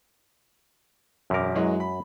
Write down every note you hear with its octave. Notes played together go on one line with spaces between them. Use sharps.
E1 F#2 A#4 D6
E3 F#3 G#3
B5